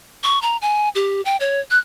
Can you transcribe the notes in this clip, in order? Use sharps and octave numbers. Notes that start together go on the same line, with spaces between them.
C#6
A#5
G#5
G4
G5
C#5
F#6